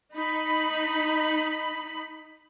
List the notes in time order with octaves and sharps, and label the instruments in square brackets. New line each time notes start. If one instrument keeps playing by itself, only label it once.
[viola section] D#4 B5